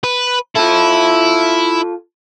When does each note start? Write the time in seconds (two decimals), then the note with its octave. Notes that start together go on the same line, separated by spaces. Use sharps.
0.04 B4
0.56 E4 F4 A4